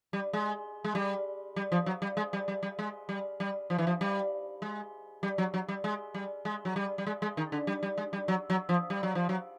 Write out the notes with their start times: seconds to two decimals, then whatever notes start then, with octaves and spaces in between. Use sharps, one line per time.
0.13 G3
0.33 G#3
0.84 G#3
0.95 G3
1.56 G3
1.72 F3
1.86 F#3
2.02 G3
2.17 G#3
2.33 G3
2.48 G3
2.63 G3
2.79 G#3
3.09 G3
3.40 G3
3.70 F3
3.78 E3
3.87 F3
4.01 G3
4.62 G#3
5.23 G3
5.38 F#3
5.54 F#3
5.68 G3
5.84 G#3
6.14 G3
6.45 G#3
6.65 F#3
6.76 G3
6.98 G3
7.06 G#3
7.22 G#3
7.37 D#3
7.52 D3
7.67 G3
7.83 G3
7.98 G#3
8.13 G3
8.28 F#3
8.50 F#3
8.69 F3
8.90 G3
9.03 F#3
9.15 F3
9.29 F#3